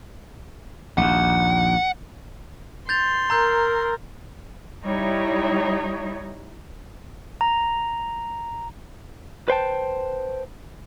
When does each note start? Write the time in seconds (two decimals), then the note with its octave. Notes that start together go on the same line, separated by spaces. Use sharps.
0.98 A#1 D#2 F#5
2.89 C6 G6 A6 F7
3.30 A#4 A#5 E6 G6
4.84 G3 D#4 E4 C#5
7.41 A#5
9.48 B4 C5 G5 A5